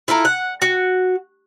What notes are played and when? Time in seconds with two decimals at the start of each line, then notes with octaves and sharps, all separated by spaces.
0.08 E4 F4 A4 A#4
0.25 F#5
0.62 F#4